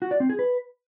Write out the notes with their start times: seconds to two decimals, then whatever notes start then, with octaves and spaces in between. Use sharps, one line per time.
0.02 F#4
0.11 D5
0.20 C4
0.30 G#4
0.39 B4